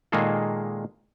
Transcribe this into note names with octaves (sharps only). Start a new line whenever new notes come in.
A#2 D#3 G#3 A#3 G#4 A4